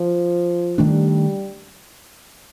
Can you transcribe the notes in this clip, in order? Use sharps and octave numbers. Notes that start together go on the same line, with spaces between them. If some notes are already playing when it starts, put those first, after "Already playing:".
Already playing: F3
D#3 G3 A3 D4